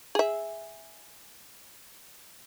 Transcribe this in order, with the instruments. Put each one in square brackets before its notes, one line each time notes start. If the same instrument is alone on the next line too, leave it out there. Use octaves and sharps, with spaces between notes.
[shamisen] G#4 E5